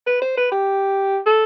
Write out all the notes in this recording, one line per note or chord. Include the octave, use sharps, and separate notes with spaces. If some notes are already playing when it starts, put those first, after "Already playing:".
B4
C5
B4
G4
A4